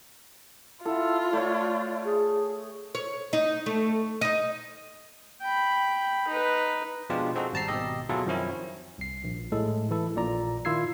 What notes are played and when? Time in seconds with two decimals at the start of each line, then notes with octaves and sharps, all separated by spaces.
0.85 E4 F4 A4
1.33 A3 C#5 D5
2.05 G#4
2.95 C#5
3.33 D#4
3.66 A3
4.21 D#4 D#5
5.42 G5 B5
6.28 D#4 B4
7.10 B2 F3 G#3 D4 F4 G4
7.36 C4 D#4 F#4 G#4 A4
7.53 G#1 G3 A5 A#5 C7
7.68 G#1 G#2 B2 G4 D#5 E6
8.09 B2 F#3 E4 F4 G#4 A4
8.26 F#2 D#3 F3 C4 C#4 E4
8.98 C2 C7
9.24 A#1
9.52 A2 G#3 A4
9.91 E3 E4 A4
10.16 A#1 A#2 D5 A#5
10.65 D#3 E4 F4 E6 G#6 C7